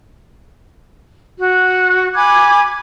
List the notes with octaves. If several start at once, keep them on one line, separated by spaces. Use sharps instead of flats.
F#4
G#5 B5 D6 G#6